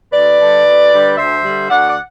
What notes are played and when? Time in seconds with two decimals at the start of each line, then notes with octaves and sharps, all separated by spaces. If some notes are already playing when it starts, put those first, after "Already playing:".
0.13 D2 B4 D5
0.39 D3 G3
0.65 D2
0.91 D3 G3
1.18 D2 C5 E5
1.44 D3 G3
1.70 D2 D5 F#5
1.88 D5